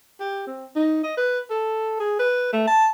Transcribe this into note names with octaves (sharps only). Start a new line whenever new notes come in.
G4
C4
D#4
D#5
B4
A4
G#4
B4
A3
A5